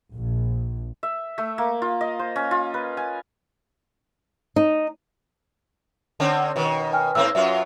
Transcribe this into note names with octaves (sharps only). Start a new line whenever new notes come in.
A#1
E5
A3
A#3
F4
D#5
C5
C#4
F4
B4
G#5
D#4
D3 C4 C#4
B2 D#3
G5 G#5 F6
G#2 A#3 C4 E6
F#2 F#3 F4 E5